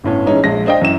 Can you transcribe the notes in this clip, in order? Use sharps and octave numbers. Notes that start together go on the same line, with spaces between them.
G1 A2 C#4
E3 G#3 C#4 D#4
A#1 G#3 A#6
D4 C5 D#5 F5 G5
F#2 E3 E7